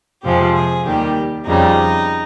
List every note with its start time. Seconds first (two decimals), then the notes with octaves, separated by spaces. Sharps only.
0.23 F2 C3 F3 G#3 G4
0.54 G#4
0.85 D#2 D#3 G3 G4
1.45 F2 C#3 G3 D#4